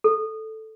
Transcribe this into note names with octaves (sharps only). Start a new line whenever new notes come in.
A4